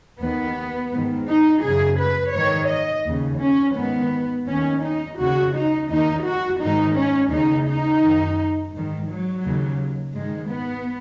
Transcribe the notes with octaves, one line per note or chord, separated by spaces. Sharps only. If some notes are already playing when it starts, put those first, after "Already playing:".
D#2 D#3 B3
G#2 D#3
D#4
F#2 C#3 G#4
B4
G#2 D#3 C#5
D#5
D#2 C#3
C#4
G#2 D#3 B3
D#2 D#3 C#4
D#4
D#2 C#3 F#4
D#4
D#2 D#3 D#4
F#4
G#2 D#3 D#4
C#4
D#2 C#3 D#4
D#4
F#2 D#3
G#2 D#3
F#3
D#2 C#3
G#2 D#3 G#3
B3